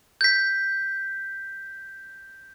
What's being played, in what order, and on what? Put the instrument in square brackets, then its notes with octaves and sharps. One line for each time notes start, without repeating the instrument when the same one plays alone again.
[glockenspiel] G6 B6